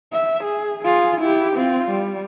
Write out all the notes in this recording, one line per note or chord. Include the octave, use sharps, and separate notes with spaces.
E5
G#4
F4 G#4
E4 G4
C4 F4
G3